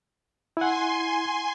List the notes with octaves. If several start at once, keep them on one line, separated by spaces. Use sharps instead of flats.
E4 F#5 G#5 C6